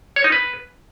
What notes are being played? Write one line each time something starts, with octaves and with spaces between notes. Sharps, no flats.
C#5
D#4
B4